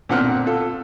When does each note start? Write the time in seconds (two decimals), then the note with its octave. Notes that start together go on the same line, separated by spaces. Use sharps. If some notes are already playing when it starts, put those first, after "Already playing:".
0.09 A#2 D3 C4 F#5 F6
0.46 F4 A4